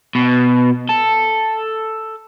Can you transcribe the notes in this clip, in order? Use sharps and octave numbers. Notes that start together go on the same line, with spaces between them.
B2
A4